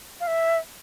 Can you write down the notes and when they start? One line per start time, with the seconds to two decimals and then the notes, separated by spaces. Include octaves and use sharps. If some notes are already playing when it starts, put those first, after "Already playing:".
0.20 F5
0.27 E5